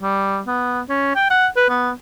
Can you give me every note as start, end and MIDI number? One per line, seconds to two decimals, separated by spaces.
0.02 0.41 55
0.47 0.81 59
0.89 1.12 61
1.16 1.26 79
1.30 1.47 78
1.56 1.68 71
1.69 1.91 59